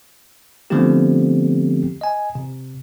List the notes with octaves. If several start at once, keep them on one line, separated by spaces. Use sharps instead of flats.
D3 F3 A3 B3 C4 G4
D#5 G#5
C3